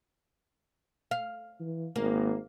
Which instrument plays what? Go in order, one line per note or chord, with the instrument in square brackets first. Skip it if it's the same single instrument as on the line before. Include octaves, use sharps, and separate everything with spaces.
[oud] F5
[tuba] E3
[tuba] G#1 [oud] A#3